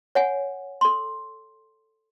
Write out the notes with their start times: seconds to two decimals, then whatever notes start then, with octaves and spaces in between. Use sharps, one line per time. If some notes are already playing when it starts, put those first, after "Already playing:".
0.15 C#5 F#5 G#5
0.81 A4 C6